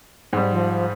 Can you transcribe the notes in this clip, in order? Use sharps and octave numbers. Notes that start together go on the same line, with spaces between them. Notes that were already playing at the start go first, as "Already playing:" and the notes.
G#2 G3
F3